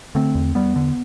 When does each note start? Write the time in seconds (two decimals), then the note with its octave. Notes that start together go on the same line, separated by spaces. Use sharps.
0.15 D3 A3 C4
0.35 E2
0.55 E2 G3 B3
0.76 D3